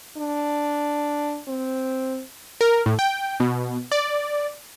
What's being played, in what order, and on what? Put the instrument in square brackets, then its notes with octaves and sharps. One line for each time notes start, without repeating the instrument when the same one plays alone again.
[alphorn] D4
C4
[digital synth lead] A#4
A2
G5
B2
D5